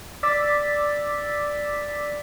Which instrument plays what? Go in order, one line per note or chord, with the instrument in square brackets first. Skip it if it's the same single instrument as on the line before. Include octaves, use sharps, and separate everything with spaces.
[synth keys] D5 D6 E6 A6 B6